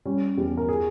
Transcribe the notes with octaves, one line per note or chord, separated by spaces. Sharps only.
G3 C#4
E2 G4
A#4
G#4